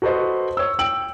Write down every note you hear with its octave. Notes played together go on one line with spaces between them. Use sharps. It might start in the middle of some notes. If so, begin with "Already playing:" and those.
F#4 A4 B4 C5 D#5
C#5 E6
G5 E6 D7 F#7